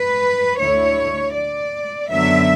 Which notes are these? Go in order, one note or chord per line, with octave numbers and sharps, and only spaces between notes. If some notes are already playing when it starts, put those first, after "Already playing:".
Already playing: B4
D2 D3 A3 E4 C#5
D5
F#2 D3 F#3 B3 E5